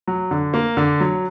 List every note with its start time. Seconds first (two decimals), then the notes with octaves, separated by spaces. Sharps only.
0.08 F#3
0.31 D3
0.54 A#3
0.77 D3
1.00 F#3